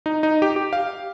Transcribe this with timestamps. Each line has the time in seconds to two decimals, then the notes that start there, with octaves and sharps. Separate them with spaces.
0.06 D#4
0.23 D#4
0.42 G4
0.56 G4
0.73 F5